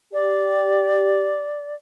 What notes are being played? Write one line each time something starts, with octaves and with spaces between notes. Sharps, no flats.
G4 D5